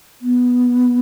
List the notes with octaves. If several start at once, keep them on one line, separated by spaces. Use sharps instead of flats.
B3